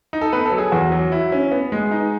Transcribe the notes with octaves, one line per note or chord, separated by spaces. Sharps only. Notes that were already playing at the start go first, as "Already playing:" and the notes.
D#4
A4
B3 B4
A4
F#3
G#4
E2 F#4
F#3
E4
C#4
B3
G#3
D#4